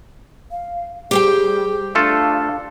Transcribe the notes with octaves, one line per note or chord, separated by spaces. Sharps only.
F5
G3 G4 G#4 C5 G5
A3 D4 F4 A4 F5